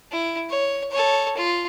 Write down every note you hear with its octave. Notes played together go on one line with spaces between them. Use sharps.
E4
C#5
A4 C#5
F4